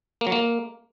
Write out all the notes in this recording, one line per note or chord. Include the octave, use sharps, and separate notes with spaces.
A#3
F#3
A#3